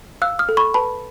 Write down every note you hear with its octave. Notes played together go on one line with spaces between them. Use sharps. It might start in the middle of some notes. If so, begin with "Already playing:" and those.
F5 E6 F#6
D#6 F6
A4
B5 C#6
B4 A5 B5